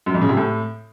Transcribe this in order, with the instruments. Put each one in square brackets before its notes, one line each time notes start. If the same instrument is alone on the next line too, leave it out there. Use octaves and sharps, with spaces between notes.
[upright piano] F#2
F2
C#3
C3
A2